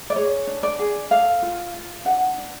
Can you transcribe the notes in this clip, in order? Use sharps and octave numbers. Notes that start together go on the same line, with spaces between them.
D5
G#4 C#5
D4
D5
G#4
A4 F5
F4
F4
D4 F#5
D4